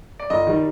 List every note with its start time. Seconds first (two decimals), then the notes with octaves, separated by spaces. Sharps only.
0.20 D5
0.30 G1 D#5
0.47 D#3 G3